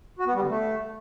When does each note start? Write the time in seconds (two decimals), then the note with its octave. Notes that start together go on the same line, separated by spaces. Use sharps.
0.19 F#4
0.27 B3
0.34 G3
0.41 D3
0.49 A3